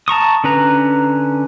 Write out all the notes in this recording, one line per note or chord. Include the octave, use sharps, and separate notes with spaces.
A5 A#5 C#6 D#6
D3 C#4 B4 A#5